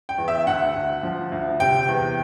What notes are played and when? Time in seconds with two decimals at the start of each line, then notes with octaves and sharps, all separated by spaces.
0.09 G5
0.18 E2
0.28 E5
0.46 D2 F#5
0.76 D2
1.03 F3
1.32 D2
1.60 C3 G5
1.88 E2